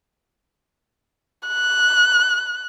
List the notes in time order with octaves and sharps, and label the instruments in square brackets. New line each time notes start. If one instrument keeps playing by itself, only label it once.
[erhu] F#6